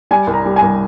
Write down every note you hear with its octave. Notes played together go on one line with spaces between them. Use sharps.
G3 G#5
C2
A#5
G3
G#5
C2